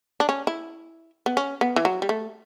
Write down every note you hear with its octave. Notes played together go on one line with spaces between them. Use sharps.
D4
C#4
E4
B3
C#4
B3
E3
F#3
G3
A3